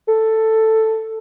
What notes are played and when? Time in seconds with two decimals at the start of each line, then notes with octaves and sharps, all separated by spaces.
0.08 A4